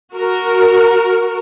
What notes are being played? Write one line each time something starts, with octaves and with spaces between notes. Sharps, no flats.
F#4 A#4